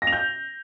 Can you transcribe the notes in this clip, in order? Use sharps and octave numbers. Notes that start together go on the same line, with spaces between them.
A#6
F7
G6